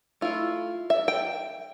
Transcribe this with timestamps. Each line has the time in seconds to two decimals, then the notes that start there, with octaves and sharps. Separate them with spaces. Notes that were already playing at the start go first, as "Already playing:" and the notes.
0.21 A3 E4 F4
0.90 E5
1.08 G5